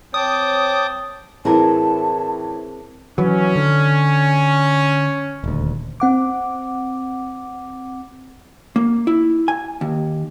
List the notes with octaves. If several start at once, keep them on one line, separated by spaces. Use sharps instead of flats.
C4 C#5 G5 A5 D6 D#6
A2 E3 C4 E4 G#4 A#4 A5
E3 F#3 C#4
D3
D#1 D2
C4 F#5 D6
A#3
E4
G#5
D#2